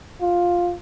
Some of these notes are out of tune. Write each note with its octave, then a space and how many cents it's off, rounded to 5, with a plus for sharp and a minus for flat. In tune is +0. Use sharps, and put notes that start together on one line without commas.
F4 +10